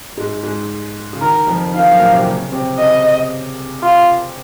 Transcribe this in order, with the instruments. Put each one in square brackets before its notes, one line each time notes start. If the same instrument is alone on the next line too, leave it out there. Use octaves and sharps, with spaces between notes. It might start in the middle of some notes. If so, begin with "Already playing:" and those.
[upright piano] G#2 G#3
G#2 G#3
C#3
[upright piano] D#3 [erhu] A#4
[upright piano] F2 F3
[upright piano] D#3 [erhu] F5
[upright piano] F#2 F#3
A#2 A#3
C3 C4
C#3 C#4
C3 C4
[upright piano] C#3 C#4 [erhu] D#5
[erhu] F4